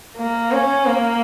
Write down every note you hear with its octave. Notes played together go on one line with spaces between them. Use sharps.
A#3
C#4
A#3